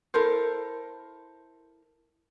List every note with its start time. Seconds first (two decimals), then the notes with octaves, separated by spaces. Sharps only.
0.14 E4 A4 A#4 C5